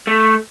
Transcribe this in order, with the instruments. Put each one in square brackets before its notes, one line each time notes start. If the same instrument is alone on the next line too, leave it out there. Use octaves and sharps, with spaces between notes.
[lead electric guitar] A3